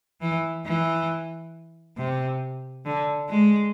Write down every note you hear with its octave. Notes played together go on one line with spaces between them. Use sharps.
E3
E3
C3
D3
G#3